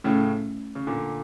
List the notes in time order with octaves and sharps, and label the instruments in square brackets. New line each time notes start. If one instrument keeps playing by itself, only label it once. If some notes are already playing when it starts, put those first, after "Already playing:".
[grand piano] A2 C#3 [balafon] A3 C#4 E4
[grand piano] C#3
A#2 D3